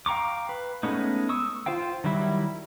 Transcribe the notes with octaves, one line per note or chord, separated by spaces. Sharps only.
F5 G5 A#5 C#6 D6
B4
G#3 A3 B3 C#4 D#4
C#6 D#6 E6
F4 C5 F5 G5
D#3 F#3 G3 E4